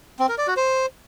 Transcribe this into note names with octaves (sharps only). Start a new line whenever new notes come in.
C4
A#4
D5
F#4
C5